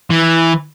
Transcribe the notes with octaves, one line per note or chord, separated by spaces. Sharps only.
E3